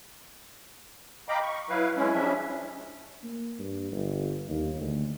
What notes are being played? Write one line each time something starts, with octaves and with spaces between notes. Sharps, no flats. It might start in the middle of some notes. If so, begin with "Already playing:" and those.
D#5 F5 G5 A#5 B5 D6
C#6
F#3 E4 B4 F5
G#3 C#4 E4
C#3 F3 G3 C#4 D4 E5
A#3
G2
G1
D#2
D2